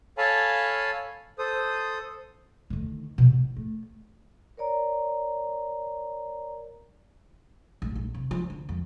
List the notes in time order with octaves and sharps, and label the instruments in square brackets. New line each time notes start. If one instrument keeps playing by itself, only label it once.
[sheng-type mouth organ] A4 C#5 F5 G#5 A5 B5
A4 C5 D#6
[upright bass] D2 D#3
B2
A1
A3
[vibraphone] A#4 C#5 D5 A#5
[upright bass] A1
A#1
C3
F3
D3
F2